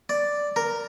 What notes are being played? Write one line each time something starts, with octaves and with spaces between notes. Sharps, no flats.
D5
A#4